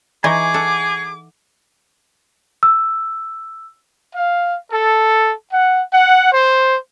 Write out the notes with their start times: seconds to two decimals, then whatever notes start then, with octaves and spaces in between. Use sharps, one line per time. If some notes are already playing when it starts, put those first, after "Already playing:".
0.24 E3 D#4 G#4 D#5 G#5 C#6 D6
0.54 A4 F#5
2.63 E6
4.16 F5
4.72 A4
5.52 F#5
5.93 F#5
6.33 C5